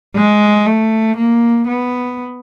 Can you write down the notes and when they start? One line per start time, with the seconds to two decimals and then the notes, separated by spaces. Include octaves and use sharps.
0.16 G#3
0.66 A3
1.17 A#3
1.68 B3